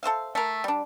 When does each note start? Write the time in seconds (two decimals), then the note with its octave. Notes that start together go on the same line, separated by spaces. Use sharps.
0.03 A4 C5 E5 F5
0.35 A3 A#4
0.64 G3 D4